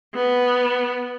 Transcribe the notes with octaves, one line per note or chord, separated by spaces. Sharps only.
B3